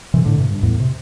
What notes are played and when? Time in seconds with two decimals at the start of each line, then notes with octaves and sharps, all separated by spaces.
0.14 C3 E3
0.25 A2 D3
0.37 G2 C3
0.51 G2
0.63 E2 A2
0.80 C3